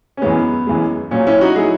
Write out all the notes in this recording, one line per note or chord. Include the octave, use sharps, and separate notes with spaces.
C#4
F#2 E3 G#3 B3
F#2 E3 G#3
A#2 F#3 C#4
C#4 E4
D#4 F#4
F#3 E4 G#4